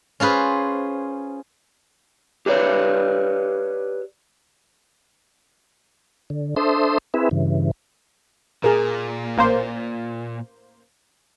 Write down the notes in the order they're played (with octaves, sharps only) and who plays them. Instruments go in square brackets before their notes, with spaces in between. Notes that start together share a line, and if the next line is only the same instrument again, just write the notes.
[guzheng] C#4 F4 G#4 B4 C5
[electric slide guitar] G4 B4 C#5 D5
[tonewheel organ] D3
D4 A4 C5 E5 C6 D#6
C4 E4 G#4 B4 E5
G2 C#3 E3
[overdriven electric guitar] A#2 [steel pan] G#4 A#4
[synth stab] A1 A#3 C5